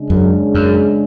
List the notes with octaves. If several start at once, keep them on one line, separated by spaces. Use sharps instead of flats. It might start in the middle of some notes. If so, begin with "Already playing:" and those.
Already playing: C#3 G#3 D4
F#2
F#2